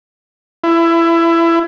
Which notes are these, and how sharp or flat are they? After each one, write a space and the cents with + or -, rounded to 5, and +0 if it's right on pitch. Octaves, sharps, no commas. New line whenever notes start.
E4 +20